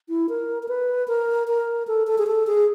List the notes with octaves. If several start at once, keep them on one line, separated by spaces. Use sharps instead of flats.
E4
A#4
A#4
B4
A#4
A#4
A4
A4
G#4
A4
G#4